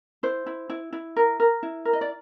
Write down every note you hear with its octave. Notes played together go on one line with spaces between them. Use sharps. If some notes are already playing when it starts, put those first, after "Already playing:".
E4 C5
E4
E4
E4
A#4
A#4
E4
A#4
D#5
D5